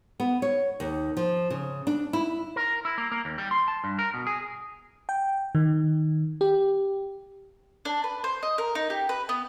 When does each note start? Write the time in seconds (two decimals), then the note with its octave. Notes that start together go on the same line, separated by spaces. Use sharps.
0.20 B3
0.42 C#5
0.80 D#2
1.17 F3
1.50 C#3
1.87 D4
2.13 E4
2.56 A#4
2.85 E4
2.98 A#3
3.12 A#3
3.25 D#2
3.38 G3
3.51 C6
3.68 A5
3.84 G2
3.99 A#4
4.14 B2
4.27 G#4
5.09 G5
5.55 D#3
6.41 G4
7.85 D4
8.04 B4
8.24 C5
8.43 D#5
8.58 A#4
8.75 D#4
8.90 G4
9.09 B4
9.29 B3